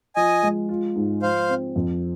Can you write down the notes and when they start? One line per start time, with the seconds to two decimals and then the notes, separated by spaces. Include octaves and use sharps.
0.16 F3 D#5 G#5
0.43 G#3
0.69 F4
0.96 G#2
1.22 F3 C5 F5
1.49 C4
1.76 F2